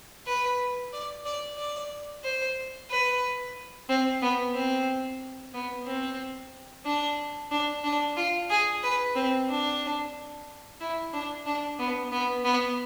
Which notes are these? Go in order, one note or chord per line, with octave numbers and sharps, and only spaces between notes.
B4
D5
D5
D5
C5
B4
C4
B3
C4
B3
C4
D4
D4
D4
F4
G#4
B4
C4
D4
E4
D4
D4
B3
B3
B3